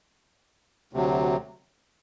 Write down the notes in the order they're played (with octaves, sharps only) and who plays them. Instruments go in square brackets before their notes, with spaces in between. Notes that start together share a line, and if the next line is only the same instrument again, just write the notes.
[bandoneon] D2 C3 F#3